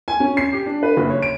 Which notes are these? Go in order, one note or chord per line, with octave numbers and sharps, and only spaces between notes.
G#5
C#4
C7
G4
D4
B4
F#1
C#5
D7